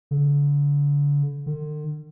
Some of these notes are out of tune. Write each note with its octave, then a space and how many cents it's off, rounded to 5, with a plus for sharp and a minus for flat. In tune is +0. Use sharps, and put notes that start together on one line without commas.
D3 -35
D3 +45